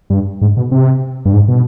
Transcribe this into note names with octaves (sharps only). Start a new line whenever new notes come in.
G2
G#2
B2
C3
G2
G#2
B2